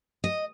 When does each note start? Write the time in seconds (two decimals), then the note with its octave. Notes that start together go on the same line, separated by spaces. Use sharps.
0.24 D#5